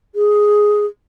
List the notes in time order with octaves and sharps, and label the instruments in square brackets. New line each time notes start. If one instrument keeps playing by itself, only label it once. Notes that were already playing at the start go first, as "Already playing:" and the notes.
[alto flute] G#4